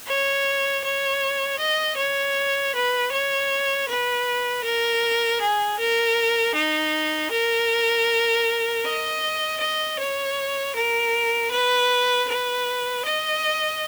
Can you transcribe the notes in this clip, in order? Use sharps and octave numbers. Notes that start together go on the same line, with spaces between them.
C#5
C#5
D#5
C#5
B4
C#5
B4
A#4
G#4
A#4
D#4
A#4
D#5
D#5
C#5
A#4
B4
B4
D#5